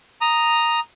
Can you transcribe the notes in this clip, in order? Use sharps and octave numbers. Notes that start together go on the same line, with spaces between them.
A#5 D#6